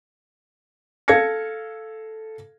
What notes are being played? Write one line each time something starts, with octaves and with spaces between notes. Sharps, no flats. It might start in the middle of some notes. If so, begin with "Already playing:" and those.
A4 F5 G#6 A#6 C#7